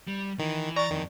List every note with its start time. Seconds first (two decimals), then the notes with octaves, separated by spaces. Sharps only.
0.07 G3
0.39 D#3 E3
0.76 D5 A#5 C#6 A6
0.91 F2 D#3 E3